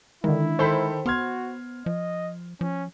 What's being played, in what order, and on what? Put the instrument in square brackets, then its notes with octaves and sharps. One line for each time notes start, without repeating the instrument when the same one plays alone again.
[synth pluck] D3 D#3 [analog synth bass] G#3 [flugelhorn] E4
[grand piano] D#3 A4 [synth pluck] C5 B5
[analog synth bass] B3 [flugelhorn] F#4 [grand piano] C6 F6 G#6
[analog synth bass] F3 [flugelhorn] D#5
[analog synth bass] F3 [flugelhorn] C#4